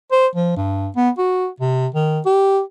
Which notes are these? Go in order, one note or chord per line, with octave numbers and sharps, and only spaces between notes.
C5
F3
G2
B3
F#4
C3
D#3
G4